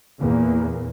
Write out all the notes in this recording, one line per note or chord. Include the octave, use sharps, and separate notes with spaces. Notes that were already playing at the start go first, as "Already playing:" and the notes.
E2 A#2 A#3